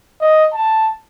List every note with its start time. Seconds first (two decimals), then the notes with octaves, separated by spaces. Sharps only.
0.21 D#5
0.54 A5